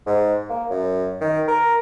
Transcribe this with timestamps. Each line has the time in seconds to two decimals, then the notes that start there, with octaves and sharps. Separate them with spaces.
0.06 G#2
0.49 A#3
0.70 F#2
1.21 D#3
1.47 A#4